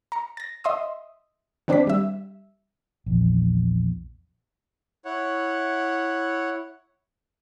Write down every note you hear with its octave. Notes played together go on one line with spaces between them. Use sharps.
A#5 C#7
A6 A#6
D#5 E5 C6 D#6
D#3 C4 D4 C5 D6 B6
G3 E5
A#1 E2
E4 C#5 F#5